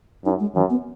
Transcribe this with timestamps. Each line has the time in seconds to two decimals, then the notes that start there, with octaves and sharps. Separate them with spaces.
0.24 F#2 D#4
0.40 G#3
0.55 F#2 E3
0.70 B3